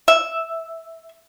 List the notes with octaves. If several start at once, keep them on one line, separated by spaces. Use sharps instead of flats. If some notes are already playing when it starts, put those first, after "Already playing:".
E5